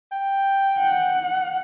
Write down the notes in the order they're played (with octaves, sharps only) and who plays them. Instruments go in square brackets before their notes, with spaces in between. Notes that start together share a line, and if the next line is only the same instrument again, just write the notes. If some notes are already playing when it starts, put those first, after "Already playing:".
[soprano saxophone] G5
[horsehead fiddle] F#5